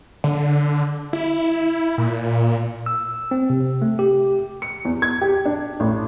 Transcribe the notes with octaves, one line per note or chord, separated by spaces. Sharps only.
D3
E4
A#2
E6
C4
C3
A3
G4
C#7
E2
G#6
G4
D4
A1